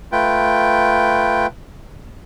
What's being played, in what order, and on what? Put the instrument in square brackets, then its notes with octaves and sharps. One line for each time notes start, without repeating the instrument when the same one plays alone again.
[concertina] A3 F4 B4 G5